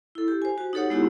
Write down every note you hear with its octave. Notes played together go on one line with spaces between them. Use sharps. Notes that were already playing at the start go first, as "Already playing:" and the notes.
E4 A4
G4
C5 G#5
F#4
D#4 G4 A4 C#5 F#5
G#3 B3 D#4 E4 F#4 G4